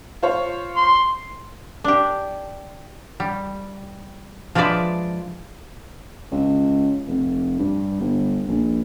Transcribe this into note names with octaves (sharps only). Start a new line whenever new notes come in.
F4 C5 C#5
C6
D4 G4
G3
F3 G#3 D4 B4 D5 E5
C#2
F1
G2
G1
A#1